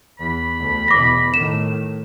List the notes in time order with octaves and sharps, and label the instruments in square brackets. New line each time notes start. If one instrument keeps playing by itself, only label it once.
[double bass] E2 [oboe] B5
[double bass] D2
[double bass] E2 B2 [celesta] D6 A#6
[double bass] A2 D#3 [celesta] E7